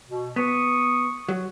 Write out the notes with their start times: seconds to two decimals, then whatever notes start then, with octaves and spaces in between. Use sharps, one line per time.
0.07 B2
0.36 B3 C#6 D#6
1.29 F#3